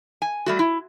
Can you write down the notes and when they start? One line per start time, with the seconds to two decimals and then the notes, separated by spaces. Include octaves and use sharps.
0.22 G#5
0.46 G3 A3 F#4
0.59 E4